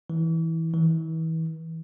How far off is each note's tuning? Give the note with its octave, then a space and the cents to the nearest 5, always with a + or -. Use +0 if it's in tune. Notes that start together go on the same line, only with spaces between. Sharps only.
E3 -20
E3 -35